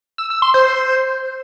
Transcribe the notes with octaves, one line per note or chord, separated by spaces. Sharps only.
E6
E6
C6
C5